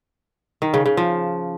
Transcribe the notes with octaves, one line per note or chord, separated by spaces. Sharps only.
D#3
C#3
C#3
F3